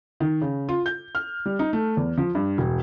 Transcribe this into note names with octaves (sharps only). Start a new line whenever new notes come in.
D#3
C#3
F4
G6
F6
G3
D#4
A3
E2
F3
G2
E1